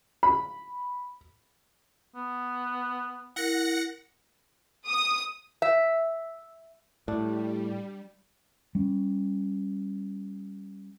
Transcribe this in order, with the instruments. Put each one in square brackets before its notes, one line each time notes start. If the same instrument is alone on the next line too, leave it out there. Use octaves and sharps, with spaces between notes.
[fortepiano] B5
[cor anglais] B3
[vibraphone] E4 A#4 [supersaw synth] F#5 A#6 C#7
[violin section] D#6
[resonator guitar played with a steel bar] E5
[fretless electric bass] A2 [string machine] G3 [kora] D4
[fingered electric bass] G3 C#4